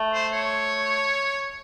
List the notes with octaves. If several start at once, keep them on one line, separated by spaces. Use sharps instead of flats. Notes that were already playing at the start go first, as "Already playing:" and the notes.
Already playing: A3
C5
C#5